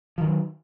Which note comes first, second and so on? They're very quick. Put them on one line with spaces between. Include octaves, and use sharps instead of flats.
F3 D#3 F#3